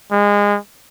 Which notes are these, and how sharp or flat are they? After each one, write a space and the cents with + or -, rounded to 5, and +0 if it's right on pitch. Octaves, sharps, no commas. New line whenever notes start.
G#3 -25